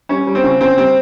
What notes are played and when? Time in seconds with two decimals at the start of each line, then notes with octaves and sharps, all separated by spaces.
0.09 G3 C#4
0.27 G3
0.35 C4
0.44 C#3
0.61 C#3 C4
0.78 G3 C4